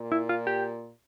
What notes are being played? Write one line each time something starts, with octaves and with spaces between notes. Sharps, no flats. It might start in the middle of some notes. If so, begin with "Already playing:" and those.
Already playing: A#2
E4
F4
G4